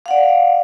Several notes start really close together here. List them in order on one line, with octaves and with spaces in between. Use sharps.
F5 F#5 D5